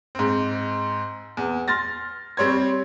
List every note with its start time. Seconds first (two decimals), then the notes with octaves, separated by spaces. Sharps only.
0.15 G#2 C4
1.37 E2
1.68 C6 F6 A6 A#6
2.37 G3 C4 C#5 C6 G#6